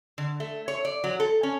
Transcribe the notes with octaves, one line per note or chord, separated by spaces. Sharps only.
D3
A3
C#5
D5
F#3
A4
C#4